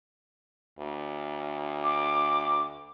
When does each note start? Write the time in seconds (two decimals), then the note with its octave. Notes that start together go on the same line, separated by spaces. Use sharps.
0.79 D2
1.84 D6